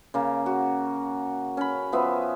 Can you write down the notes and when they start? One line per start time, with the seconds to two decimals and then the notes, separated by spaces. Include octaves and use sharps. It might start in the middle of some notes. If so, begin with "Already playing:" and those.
0.14 C#3 A#3
0.46 F#4
1.57 C#4 B5
1.92 F3 B3 E5